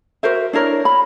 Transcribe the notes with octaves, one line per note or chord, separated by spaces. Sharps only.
F#4 A#4 C5 E5
D4 E4 A#4 C#5
B5